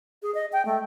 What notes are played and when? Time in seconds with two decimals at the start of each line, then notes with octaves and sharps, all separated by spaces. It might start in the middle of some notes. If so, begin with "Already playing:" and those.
0.23 G#4
0.35 D#5
0.53 G5
0.65 A3